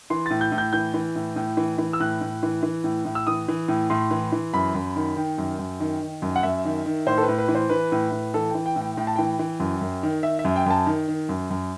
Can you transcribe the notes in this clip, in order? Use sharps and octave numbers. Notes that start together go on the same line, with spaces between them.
E3 C6
A2 A6
G6
A2
G6
E3 G6
E3
A2
A2
E3
E3
E6
A2 F#6
A2
E3
E3
A2
A2
E6
E3 D#6
E3
A2
A2 C6
E3
E3
F#2 B5
F#2
D#3
D#3 G5
F#2
F#2
D#3
D#3
F#2
F#5
F#2 E5
D#3
D#3
A2 C5
A4
B4
A2
B4
E3
C5
E3 B4
A2
A2
E3 A4
E3 G5
G5
A2
G5
A2 G5
A5
E3 G5
E3
F#2
F#2
D#3
D#3 E5
E5
F#2
G5
F#2 A5
D#3
D#3
F#2
F#2